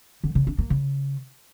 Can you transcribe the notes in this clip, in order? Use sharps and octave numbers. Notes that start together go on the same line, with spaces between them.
D3
C#3
D4
A#3
C#3